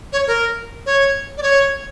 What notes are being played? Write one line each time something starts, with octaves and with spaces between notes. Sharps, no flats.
C#5
A#4
C#5
D5
C#5